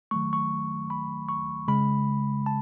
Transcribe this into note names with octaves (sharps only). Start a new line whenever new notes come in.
D#3 F#3 A3 C#6
C#6
B5
C#6
C#3 G#3 B5
A5